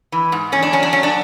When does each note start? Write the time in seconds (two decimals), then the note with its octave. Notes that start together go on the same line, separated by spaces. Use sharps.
0.12 E3
0.32 G#2
0.52 E2 C#4
0.63 D4
0.73 F#3 C#4
0.83 D4
0.93 F#3 C#4
1.03 D4